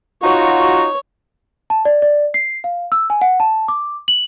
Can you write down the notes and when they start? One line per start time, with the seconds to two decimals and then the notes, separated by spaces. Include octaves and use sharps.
0.23 D#4 F4 F#4 C#5
1.70 A5
1.85 D5
2.02 D5
2.34 C7
2.64 F5
2.92 E6
3.10 G#5
3.21 F#5
3.40 A5
3.68 D6
4.08 F#7